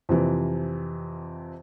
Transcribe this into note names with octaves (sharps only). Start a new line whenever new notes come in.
F2 C3 E3